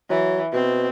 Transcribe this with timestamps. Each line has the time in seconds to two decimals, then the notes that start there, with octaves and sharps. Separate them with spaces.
0.10 E3 F#3
0.53 B2 C4